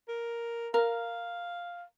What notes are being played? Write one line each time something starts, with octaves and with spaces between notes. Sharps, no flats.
A#4
A#4 F5